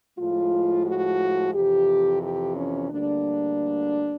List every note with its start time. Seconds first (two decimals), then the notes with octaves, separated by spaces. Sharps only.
0.18 A2 F3 G#3 F4
0.87 F#4
1.54 F2 C3 E3 G4
2.22 G4
2.56 C#4
2.90 D2 D3 G3 A#3 D4